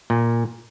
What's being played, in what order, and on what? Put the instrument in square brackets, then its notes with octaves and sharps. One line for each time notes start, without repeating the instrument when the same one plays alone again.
[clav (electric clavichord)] A#2